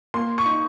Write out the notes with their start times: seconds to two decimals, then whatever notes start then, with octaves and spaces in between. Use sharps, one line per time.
0.14 A#3 C6
0.38 C#6
0.46 D#4